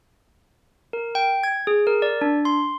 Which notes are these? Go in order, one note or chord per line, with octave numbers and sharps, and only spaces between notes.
A#4
G5
G#6
G#4
A#4
D5
D4
C6